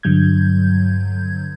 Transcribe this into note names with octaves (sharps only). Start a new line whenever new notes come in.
G2 D3 F#3 G6 G#6